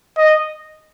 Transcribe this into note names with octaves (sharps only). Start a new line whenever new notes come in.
D#5